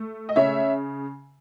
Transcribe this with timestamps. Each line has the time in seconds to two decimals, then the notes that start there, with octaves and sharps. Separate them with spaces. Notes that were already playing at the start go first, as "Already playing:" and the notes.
Already playing: A3
0.29 D#5
0.36 C#3 C#5 E5